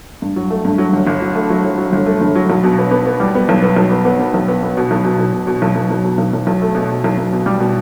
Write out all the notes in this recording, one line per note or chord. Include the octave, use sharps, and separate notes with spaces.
G2
F#3
A3
G2
F#3
G1
G1
F#3
A3
F#3
F#3
F#3
G1
A3
G1
F#3
B1
B2
B3
B3
B3
G3
B3
B1
B3
B1
B3
B3
B3
B1
B3
B3
B2
B1
B2
B1
B2
B2
B1
B1
B1
B2
B1
B1
B1
A3
B2
B2
B1
B1
B2
G3
B2